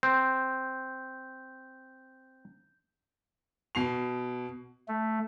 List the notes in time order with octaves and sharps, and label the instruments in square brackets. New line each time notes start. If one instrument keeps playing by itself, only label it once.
[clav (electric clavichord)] C4 [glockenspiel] G6
[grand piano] B2 C7 F7
[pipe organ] A3